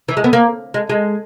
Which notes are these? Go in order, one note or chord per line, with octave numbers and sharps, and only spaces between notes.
E3
G#3
B3
A#3
G#3
G#3